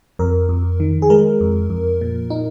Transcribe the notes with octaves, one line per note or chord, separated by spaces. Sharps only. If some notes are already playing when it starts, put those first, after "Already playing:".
F2 A#4
F2
D#3
G#4
G#3 A#4
F2
F2
A#2
D#4